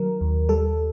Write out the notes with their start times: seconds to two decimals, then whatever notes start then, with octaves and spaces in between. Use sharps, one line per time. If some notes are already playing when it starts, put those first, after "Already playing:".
Already playing: D#3 F#3 A#4
0.21 D#2
0.49 G3 A4